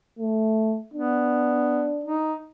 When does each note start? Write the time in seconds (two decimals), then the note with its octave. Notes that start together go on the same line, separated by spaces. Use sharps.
0.19 A3
0.94 B3 D4
2.04 D#4